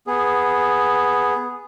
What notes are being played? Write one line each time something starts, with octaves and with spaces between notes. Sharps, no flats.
B3 G#4